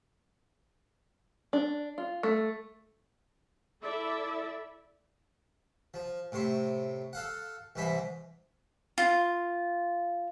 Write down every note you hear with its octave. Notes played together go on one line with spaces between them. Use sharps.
D4
F4
A3
E4 A4 D5 E5
F3
A2 C3 C5 C#6
A4 F5 F#5
C2 G#2 E3 C5 B5
F4